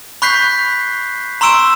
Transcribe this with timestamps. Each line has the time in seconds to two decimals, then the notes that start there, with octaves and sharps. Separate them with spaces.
0.22 B5 C#6 F#6 G6 B6 C7
1.41 A#5 C6 C#6 E6 D7 E7